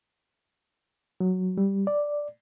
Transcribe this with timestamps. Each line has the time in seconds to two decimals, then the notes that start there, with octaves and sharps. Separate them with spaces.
1.20 F#3
1.58 G3
1.87 D5